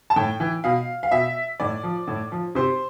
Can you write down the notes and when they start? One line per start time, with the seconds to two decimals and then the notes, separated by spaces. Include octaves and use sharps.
0.10 A5
0.16 A2 G5
0.40 E3
0.64 B2 F5
1.03 F5
1.11 B2 E5
1.60 A2 D5
1.83 F3
2.08 A2
2.32 F3
2.55 C3 C5